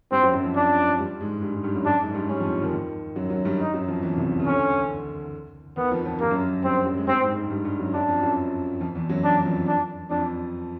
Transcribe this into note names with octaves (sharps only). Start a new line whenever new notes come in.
G2 G3 C4
F#2 F#3
F#2 F#3
F2 F3
D4
G2 G3
G#2 G#3
G2 G3
G#2 G#3
G2 G3
F#2 F#3
F#2 F#3 D4
G#2 G#3
G2 G3
G2 G3 C#4
F2 F3
D#2 D#3
D#2 D#3
F#2 F#3
F#2 F#3
G2 G3
D#4
F#2 F#3
F2 F3
E2 E3
C2 C3
C#3
D2 D3 C#4
D#2 D#3 B3
F2 F3
F2 F3
G2 G3 A#3
F#2 F#3
G2 G3 C4
F#2 F#3
G#3
G2 G3 C4
G#2 G#3
G#2 G#3
G2 G3
G2 G3
F#2 F#3
F#2 F#3 D4
F2 F3
F#2 F#3
F2 F3
E2 E3
F#2 F#3
D4
F2 F3
D4
F2 F3 D4